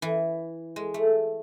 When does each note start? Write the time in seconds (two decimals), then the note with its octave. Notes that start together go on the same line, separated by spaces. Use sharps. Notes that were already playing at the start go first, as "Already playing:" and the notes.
0.02 E3
0.76 G#3
0.94 A3